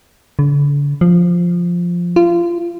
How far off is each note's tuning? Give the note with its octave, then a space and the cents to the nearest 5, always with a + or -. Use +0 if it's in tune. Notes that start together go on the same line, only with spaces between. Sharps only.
D3 -40
F3 +0
F4 -25